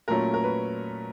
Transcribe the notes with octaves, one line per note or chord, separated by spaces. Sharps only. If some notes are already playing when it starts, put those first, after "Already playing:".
A#2 F#3 A3 C#4 A#4
A#4
B4